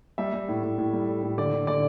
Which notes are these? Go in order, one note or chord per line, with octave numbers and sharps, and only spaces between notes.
G3 E5
G3
A2
A2
A2
G3
A2
A2
D3 D5
D3
D3 D5